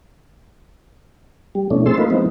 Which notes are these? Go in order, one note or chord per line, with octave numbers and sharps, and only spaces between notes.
G3
B2 E3 A3 C#4 D4
A3 C4 G#4 A5 C6 E6
A3 A#3 D#4 F4 B4
E3 F3 G#3 B3 C4 D#4